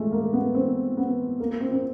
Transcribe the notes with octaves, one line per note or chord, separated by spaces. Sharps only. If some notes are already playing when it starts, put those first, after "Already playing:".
Already playing: G#3 A3
A#3
B3
C4
B3
A#3
C4
C4